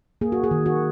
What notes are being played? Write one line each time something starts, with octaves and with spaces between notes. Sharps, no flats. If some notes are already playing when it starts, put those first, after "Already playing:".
A#3 G#4
F#4
G#4
D#3
F#4